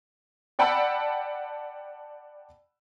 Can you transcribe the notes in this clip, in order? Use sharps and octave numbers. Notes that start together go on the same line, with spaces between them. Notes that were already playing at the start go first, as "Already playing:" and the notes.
D5 F#5 G5 A5 B5 E6